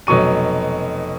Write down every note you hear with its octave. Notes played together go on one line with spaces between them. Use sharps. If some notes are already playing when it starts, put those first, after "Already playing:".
F1 B2 F#3 C#6 D#7